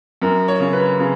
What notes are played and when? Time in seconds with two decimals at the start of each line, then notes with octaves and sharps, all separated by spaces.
0.22 F#2 A#4
0.48 C#5
0.60 C#3
0.73 B4
0.99 C#3